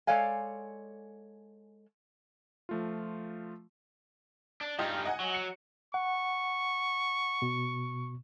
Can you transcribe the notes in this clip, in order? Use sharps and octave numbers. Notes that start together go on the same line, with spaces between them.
G#3 A4 C#5 D5 F5 G#5
F3 A3 F4
D4
G2 D#4 F4 G4 D#5
D#5 F#5 G#5
F#3
C#7
F#5 C#6
B2